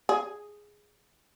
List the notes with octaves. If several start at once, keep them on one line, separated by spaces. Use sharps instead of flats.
G#4